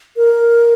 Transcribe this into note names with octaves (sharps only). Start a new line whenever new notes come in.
A#4